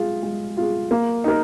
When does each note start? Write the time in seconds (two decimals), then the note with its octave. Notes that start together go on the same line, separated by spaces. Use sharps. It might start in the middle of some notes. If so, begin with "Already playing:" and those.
Already playing: G#3 F4 G#4
0.23 G#3
0.57 F4 G#4
0.91 A#3
1.24 D#4 A#4